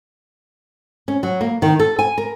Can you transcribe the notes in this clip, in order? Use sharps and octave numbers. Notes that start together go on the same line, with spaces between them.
C#4
F#3
A#3
D#3
A4
G#5
A#4